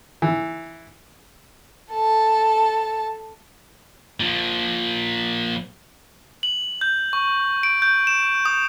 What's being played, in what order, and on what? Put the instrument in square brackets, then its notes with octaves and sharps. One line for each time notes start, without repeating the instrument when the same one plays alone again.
[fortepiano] E3
[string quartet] A4 A5
[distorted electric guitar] A#2 F3
[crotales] F#7
G6
C#6
D7
G6
E7
D#6